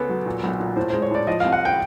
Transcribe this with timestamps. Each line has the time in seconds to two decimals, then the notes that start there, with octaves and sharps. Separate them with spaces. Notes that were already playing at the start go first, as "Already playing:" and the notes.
Already playing: C#2 B3 A4
0.09 F#3
0.26 A#2
0.43 B1
0.60 A#2
0.76 A2 C5
0.90 G#3 C5
1.02 C#5
1.11 A2 D5
1.27 F3 D#5
1.40 F5
1.44 C2
1.52 F#5
1.65 G5